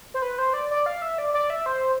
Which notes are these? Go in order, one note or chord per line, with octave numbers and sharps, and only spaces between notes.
C5
B4
C5
D5
D5
F5
E5
D5
D5
E5
C5